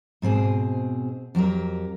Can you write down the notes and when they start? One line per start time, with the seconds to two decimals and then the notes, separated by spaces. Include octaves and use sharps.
0.22 G#2 B2 C4 G#4
1.35 F2 F#3 G4 A#4